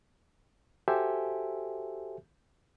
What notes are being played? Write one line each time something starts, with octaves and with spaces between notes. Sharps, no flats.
F#4 G4 A4 C5 E5 G#5